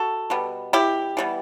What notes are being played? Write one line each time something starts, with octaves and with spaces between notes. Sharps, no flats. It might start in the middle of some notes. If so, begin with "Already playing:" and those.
Already playing: F#4 A4
B2 G3 B3
E4 G4
E3 G3 B3